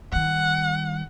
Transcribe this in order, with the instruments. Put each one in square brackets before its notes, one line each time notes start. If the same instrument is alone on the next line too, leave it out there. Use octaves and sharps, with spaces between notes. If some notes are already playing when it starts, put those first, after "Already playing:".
[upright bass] D#3 G3 [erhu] F#5